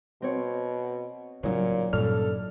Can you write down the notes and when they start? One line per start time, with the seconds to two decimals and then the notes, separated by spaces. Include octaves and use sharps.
0.22 B2 C4 C#5
1.43 A1 A#2 C#3 F#3 D#4 C#5
1.93 G2 A#2 C#3 A4 D5 F6